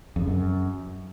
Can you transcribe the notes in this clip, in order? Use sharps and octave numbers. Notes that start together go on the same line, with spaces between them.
F2
C#3
F#2